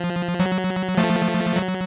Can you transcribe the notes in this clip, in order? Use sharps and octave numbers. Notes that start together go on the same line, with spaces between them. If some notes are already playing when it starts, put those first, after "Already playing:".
Already playing: F3
F#3
F3 A3
F#3